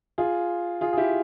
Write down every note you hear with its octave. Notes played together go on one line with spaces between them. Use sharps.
F4 G#4
F4 G#4
G#4
E4 G4